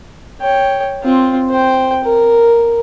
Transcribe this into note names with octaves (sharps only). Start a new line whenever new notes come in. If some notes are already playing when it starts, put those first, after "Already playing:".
C#5 G5
C4 F4
C5 G5
A#4